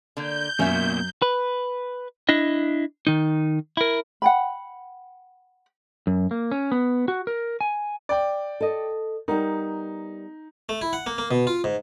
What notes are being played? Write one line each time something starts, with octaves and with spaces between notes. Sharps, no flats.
D3 A#3 G6
F#2 B2 A#3 C#4 E5
B4
D4 E4 D#5
D#3 D#4
E4 A#4
F#5 G5 B5
F#2
A#3
C#4
B3
F#4
A#4
G#5
D5 G5
A4 D#5
G3 B3 D#4 A#4
A3
E4
F#5
A#3
A#3
B2
F4
G#2